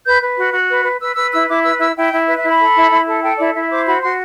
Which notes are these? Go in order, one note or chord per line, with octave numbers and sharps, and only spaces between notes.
B4 G6
B4
F#4
F#4
B4
B4
B4 E6
B4 E6
E4 E6
E4 D6
B4 E6
E4 E6
E4 G5
E4
B4 E5
E5
E4
B5
A4
E4
E4
A4
A4 G5
E4 D5
E4 E5
C5 D6
F#4 B5
F#4 C6